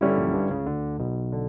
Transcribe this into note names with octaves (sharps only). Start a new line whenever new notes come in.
G2 D3 G3 C#4 E4
A#1 A#2
F#2
G2
C#2 C#3
D2 D3
B1 B2
D3